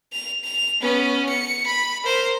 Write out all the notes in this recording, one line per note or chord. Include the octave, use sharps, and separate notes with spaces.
F7
F7
B3 C#4
C#7
B5
A#4 C5